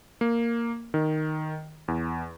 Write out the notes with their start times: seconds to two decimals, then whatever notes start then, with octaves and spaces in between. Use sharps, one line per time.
0.21 A#3
0.94 D#3
1.88 E2